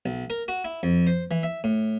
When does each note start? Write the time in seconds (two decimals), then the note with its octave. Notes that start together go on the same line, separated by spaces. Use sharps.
0.06 B1
0.30 A#4
0.48 F#4
0.65 E4
0.83 F2
1.07 C5
1.31 E3
1.43 E5
1.64 A2